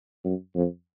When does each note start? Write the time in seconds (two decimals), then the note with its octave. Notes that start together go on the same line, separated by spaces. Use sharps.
0.25 F#2
0.55 F2